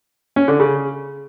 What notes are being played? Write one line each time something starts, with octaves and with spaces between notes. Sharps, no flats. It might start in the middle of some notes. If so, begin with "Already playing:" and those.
C#4
D3
C#3